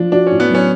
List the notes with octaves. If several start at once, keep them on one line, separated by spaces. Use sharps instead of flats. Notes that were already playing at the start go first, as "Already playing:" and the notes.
Already playing: F3 D4
D4 F#4
A2 C#4
B3
F#3 C#4